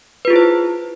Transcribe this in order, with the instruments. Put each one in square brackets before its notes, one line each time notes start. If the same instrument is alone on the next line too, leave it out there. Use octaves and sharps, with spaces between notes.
[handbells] B4
F4
G#4
E4
C5